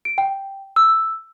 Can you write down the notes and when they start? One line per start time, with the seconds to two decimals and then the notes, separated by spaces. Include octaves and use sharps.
0.05 D7
0.18 G5
0.76 E6